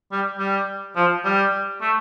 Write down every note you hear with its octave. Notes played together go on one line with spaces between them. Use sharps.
G3
G3
F3
G3
A3